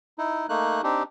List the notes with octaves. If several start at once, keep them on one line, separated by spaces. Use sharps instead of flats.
D#4 E4
A3 A#3 D#4 F#6
C4 D4 D#4 G4